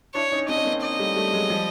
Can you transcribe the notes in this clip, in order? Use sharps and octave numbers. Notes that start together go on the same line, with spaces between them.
D4 E4 C#5
C#4 D#4
C4 D4 D#5
C#4
A#3 C4
D#5
G3 A3
G3 A3
F#3 G#3
F3 G3